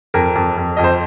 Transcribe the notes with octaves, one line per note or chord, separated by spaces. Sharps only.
F2 A#4
F2
F2
F2 D#5
C5